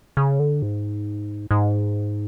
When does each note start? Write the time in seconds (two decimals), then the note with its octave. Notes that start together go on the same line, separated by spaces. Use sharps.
0.17 C#3
0.39 D3
0.62 G#2
1.51 G#2